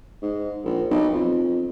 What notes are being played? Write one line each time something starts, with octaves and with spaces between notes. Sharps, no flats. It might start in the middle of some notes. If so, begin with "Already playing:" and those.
G#2
A#1
B1
F2